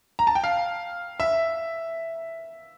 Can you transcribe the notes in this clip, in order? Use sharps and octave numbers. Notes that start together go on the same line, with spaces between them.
A#5
A5
G5
F5
E5